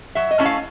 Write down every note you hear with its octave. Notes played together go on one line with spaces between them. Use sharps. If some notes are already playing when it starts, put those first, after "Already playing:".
F#3 E5
D#5
A3 C#4 E4
F5